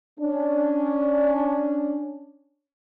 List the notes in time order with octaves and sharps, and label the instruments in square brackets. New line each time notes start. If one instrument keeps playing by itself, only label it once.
[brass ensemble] C#4 D4